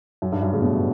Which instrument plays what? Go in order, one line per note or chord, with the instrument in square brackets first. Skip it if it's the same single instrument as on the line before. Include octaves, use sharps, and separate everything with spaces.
[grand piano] F#2
G2
F#2
A2 C#3
G2 B2